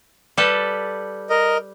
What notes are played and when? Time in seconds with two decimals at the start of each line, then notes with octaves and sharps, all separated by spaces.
0.37 G3 A4 B4
1.30 A#4 D#5